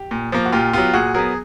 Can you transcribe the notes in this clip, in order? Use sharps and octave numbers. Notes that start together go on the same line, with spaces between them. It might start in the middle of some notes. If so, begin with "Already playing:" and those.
Already playing: G4
A#2
F3 A#3
F#4
A#2 F4 G4
F#3 B3 F4 G4
A#2 F#4 G#4
F#3 B3 G#4 A#4